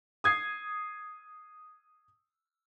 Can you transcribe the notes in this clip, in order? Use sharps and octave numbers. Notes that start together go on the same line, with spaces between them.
D#6 G#6 C7